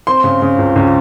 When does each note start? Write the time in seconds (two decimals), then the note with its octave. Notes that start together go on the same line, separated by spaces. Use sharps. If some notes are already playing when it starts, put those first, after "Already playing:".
0.07 C4 C6
0.24 C#3
0.42 C#3
0.59 C#2
0.76 C#2